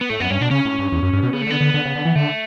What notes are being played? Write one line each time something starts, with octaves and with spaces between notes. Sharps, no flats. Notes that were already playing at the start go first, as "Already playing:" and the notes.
B3
A2 A3
F#2 B3
G2 C#4
B2 D4
C#3 C#4
A2
G2
E2
F#2
G2
B2
C#3 B3
A3
D3 B3
D3
D3
C#3
D3
E3
D3 A3